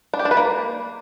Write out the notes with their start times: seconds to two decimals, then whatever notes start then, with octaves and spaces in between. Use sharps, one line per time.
0.14 D4
0.19 G4
0.25 D4
0.31 B4
0.37 A#3